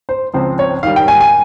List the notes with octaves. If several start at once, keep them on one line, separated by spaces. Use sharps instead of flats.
C5
C#2 C#3 F3 C4 C5
C#5
G#2 D#3 G3 F5
G5
G#5
G#5